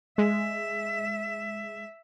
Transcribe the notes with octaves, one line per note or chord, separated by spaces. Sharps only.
G#3 E5